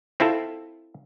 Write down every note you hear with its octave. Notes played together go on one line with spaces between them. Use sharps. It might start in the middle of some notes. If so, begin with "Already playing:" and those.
C4 E4 F4 A4